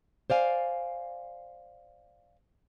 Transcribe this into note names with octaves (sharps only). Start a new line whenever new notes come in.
C5 D5 F5 G#5